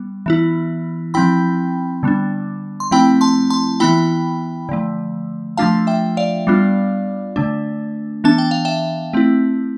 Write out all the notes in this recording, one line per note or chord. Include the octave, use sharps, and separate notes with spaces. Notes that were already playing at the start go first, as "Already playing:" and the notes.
Already playing: G3 B3
E3 B3 E4
F3 C4 E4 G5 B5
D3 G3 B3 D4
C6
F3 A3 C4 E4 G5 B5
A5 C6
A5 C6
E3 B3 E4 G5 B5
D3 F3 A3
F3 A3 D4 F4 F5 A5
E5 G5
D5 F5
G3 B3 D4 F4
D3 A3 D4
E3 B3 D4 A5
G5
F5
E5 G5
A3 C4 E4